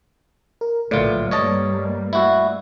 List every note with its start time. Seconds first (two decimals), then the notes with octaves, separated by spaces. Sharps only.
0.61 A#4
0.91 A#1 A2 D3 F#3 A3 F4 B4 D5
1.31 G2 G3 A#3 C#5 D#5 A5
2.13 E4 F#4